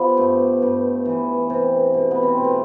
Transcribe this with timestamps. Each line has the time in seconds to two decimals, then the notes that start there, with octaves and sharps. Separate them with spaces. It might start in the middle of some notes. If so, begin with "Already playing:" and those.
Already playing: F3 B3 G4
0.17 G2 A3
0.62 G2
1.05 E3
1.50 C3
1.94 B2
2.11 B3
2.23 C4
2.38 B2
2.44 A3